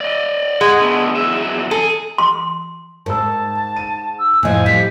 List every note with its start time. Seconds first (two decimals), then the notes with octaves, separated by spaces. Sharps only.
0.01 D5 D#5
0.61 G#3 F#5
0.80 D3 A3 B3
1.16 E2 F#3 E5
1.71 G#4 A4
2.18 C6
3.06 G#2 A#4 A5 E6
3.76 D#7
4.19 E6
4.43 F2 A2 F3 D#5 G#5
4.66 F3 G3 B6